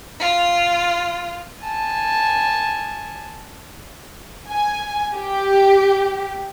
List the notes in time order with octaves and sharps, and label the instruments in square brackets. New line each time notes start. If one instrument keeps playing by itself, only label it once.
[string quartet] F4
[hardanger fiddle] G#5 A5
[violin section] G#5
G4